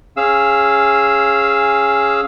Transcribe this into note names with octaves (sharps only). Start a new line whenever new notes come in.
C#4 G#4 F5 E6